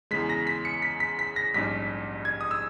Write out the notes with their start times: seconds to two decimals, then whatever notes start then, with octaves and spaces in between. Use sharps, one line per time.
0.11 E2 C#3 G#3 B6
0.30 A#6
0.47 B6
0.65 C#7
0.82 B6
1.00 B6
1.19 B6
1.36 A#6
1.54 A#1 G#2 G3 C#4 B6
2.25 G#6
2.41 D#6
2.51 E6